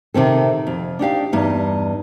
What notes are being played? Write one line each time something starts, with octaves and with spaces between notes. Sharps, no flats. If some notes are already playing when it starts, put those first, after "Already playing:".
C3 D#3 C4 A4
F2
D4 D#4 G4 F5
E2 G2 D#4